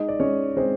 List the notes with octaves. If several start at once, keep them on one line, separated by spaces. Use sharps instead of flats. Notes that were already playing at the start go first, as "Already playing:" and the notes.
Already playing: G#3 D#4 D#5
D5
G#3 C#4 C#5
G#3 C4 C5